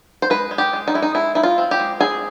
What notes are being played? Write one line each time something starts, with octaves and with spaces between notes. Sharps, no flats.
C5
G#3 B4
G#3
G4
G#3
D#4
G#3 E4
D#4
G#3 E4
D#4 E4
F4
C4
G4
G#3
C4 G#4